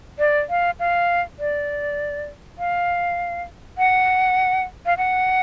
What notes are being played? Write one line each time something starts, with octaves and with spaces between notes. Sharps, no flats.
D5
F5
F5
D5
F5
F#5
F5
F#5